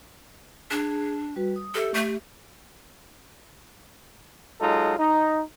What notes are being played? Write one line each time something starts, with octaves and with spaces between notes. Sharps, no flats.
D4 G#4
G3 F#4 B4
D#6
G4 A4 E5
A3
F#3 G#3 D#4 F4 A4
D#4